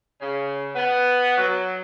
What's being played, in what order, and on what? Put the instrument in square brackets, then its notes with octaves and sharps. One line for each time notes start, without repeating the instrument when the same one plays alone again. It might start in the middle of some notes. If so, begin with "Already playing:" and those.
[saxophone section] C#3
B3
F#3